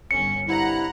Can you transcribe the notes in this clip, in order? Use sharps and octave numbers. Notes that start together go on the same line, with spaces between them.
G1 C#4 C#7
G2 C3 E4 F#5 A#5